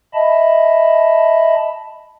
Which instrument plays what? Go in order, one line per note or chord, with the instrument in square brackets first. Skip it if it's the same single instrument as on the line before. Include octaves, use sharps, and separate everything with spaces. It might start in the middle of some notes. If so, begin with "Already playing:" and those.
[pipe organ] D#5 E5 A5 B5